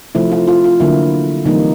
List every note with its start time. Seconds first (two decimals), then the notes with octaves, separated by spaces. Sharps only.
0.15 C3 F3 A3 E4
0.32 F4
0.48 F4
0.64 F4
0.80 D3 F#3 A#3 E4
1.45 C3 E3 G3 A#3 D#4